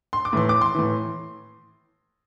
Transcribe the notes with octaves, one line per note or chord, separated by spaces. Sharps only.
C6
D6
A2 E3 C6
D6
C6
A2 E3